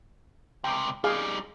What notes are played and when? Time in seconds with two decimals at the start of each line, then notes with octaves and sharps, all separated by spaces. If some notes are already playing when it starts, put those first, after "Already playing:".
0.64 C#2 C3 G5
1.04 G3 D#4 G#4 F5